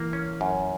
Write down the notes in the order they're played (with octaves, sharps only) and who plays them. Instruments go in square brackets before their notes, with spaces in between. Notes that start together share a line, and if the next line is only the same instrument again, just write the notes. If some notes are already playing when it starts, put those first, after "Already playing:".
Already playing: [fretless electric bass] E3 [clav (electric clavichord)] A#3
[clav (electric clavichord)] C#4
F#2